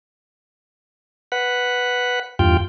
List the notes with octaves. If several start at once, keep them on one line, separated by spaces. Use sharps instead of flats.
B4 F#5
E2 G2 F4 G5